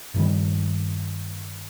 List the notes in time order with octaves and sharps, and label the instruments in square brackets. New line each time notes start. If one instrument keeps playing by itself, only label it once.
[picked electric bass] G2 D#3 G3